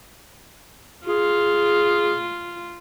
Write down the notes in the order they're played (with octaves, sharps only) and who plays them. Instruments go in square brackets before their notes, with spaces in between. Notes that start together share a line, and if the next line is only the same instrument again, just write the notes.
[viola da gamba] F4 [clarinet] G#4